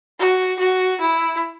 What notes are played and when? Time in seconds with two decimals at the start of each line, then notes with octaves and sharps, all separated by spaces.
0.19 F#4
0.59 F#4
1.01 E4